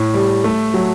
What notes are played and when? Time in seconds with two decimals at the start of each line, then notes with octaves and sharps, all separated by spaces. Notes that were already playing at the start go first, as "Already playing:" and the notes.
Already playing: A2
0.14 G3
0.44 A3
0.74 F#3